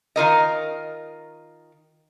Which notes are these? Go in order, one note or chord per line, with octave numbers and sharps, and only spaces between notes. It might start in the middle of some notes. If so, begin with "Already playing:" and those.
D#3 F4 A#4 D#5